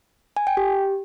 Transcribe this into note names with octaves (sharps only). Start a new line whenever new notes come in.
G#5
G5
G4